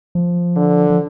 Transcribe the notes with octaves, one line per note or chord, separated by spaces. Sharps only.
F3
D3
F3